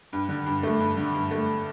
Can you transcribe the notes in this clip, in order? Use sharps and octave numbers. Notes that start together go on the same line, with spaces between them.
G2
D3
G2
A3
G2
D3
G2
A3